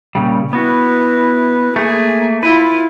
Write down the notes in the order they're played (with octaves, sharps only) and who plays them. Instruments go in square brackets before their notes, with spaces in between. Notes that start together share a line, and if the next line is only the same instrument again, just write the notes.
[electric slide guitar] A#2 C#3 G3
[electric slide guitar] B3 F#4 [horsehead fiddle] E4 B4
[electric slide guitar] A3 A#3 [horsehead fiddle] G#4
[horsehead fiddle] E4 F4 [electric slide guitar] B4